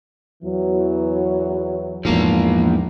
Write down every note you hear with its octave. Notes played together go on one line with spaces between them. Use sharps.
E2 E3 F#3
E2 G#2 F3 A#3